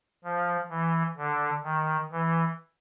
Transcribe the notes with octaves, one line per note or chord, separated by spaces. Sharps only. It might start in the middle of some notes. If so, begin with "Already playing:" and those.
F3
E3
D3
D#3
E3